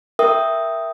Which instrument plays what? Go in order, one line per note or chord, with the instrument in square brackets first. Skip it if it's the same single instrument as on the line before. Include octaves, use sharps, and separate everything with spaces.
[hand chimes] A#4 E5 G5 D#6